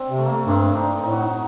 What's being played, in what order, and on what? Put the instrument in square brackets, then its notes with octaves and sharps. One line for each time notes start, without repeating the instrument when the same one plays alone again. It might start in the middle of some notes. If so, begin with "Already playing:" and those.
Already playing: [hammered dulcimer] C4 D4
[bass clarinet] C3
[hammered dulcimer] A3
A#3
A3
[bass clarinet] G2 [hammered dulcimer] C4
[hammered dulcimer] D4
D#4
[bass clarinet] A2 [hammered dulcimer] D#4
[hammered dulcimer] F#4
D#4